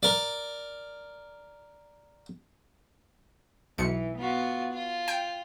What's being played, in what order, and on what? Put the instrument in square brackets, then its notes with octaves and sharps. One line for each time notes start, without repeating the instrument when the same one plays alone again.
[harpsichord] A#4 D5
[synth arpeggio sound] B1 C#7 [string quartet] E3
[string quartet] B3 F4 F#4
F4
[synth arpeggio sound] G5